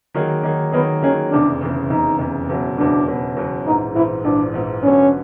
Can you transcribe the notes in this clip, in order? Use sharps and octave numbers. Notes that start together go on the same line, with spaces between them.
D#3 F#3 A#3 D#4 G#4
D#3 F#3 A#3 D#4 G#4
D#3 F#3 A#3 B3 D#4 G#4
D#3 F#3 A#3 C#4 D#4 G#4
F1 E2 C#3 D4
F1 E2 C#3
F1 E2 C#3 D#4
F1 E2 C#3
F#1 E2 B2 F#3
F#1 E2 B2 F#3 D4
F#1 E2 B2 F#3
F#1 E2 B2 F#3
A#1 G#2 E3 D#4
A#1 G#2 E3 E4
A#1 G#2 E3 D4
A#1 G#2 E3
D3 F#3 B3 C#4 D4